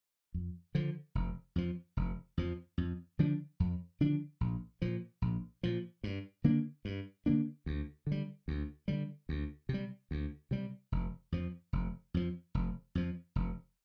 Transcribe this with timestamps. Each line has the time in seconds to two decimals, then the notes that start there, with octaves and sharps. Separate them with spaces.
0.34 F2
0.75 D3 F3
1.15 F1
1.56 F2 F3
1.97 F1
2.37 F2 F3
2.78 F2
3.19 D3 F3 D4
3.60 F2
4.01 D3 F3 D4
4.41 A#1
4.82 A#2 F3
5.22 A#1
5.63 A#2 F3
6.04 G2
6.44 D3 A#3 D4
6.85 G2
7.26 D3 A#3 D4
7.66 D2
8.07 D3 G3
8.48 D2
8.88 D3 G3
9.29 D2
9.69 C3
9.74 G3
10.11 D2
10.51 C3 G3
10.92 F1
11.32 F2 F3
11.73 F1
12.14 F2 F3
12.55 F1
12.95 F2 F3
13.36 F1